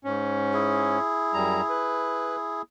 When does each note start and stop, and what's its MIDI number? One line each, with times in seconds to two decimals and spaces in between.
0.05 0.99 44
0.05 0.99 61
0.53 2.62 64
0.53 2.62 68
1.34 1.61 42
1.34 1.61 55
1.34 1.61 82
1.69 2.36 71